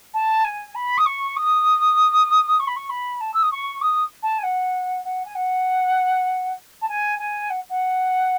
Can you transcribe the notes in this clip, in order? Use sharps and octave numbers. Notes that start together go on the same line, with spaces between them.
A5
G#5
B5
D#6
C#6
D#6
C#6
B5
C#6
B5
A5
E6
D#6
C#6
D#6
A5
G#5
F#5
F#5
G#5
F#5
A5
G#5
G#5
F#5
F#5